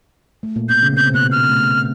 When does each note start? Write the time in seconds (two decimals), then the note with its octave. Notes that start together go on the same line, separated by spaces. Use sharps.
0.43 A3
0.56 A#2 A#3
0.69 B2 B3 G6
0.82 C#3 C#4
0.96 C3 C4 G6
1.13 B2 B3 F#6
1.32 F6
1.49 A3